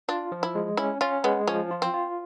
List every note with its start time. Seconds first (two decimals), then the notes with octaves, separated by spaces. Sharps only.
0.08 D4 F4
0.32 F3
0.43 E4
0.55 G#3
0.77 C#4 E4
1.01 C#4 F4
1.24 G#3 B3
1.48 F3 C#4
1.71 F4
1.82 C4
1.94 F4